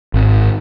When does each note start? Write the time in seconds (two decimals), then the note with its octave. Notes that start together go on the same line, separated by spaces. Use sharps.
0.14 G#1